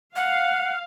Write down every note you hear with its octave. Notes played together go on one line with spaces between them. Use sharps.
F5 F#5